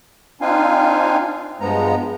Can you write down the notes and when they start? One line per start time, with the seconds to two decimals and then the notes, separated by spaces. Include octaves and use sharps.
0.41 C4 D4 D#4 F4 F5 G#5
1.61 G2 F3 G#3 B3 A#5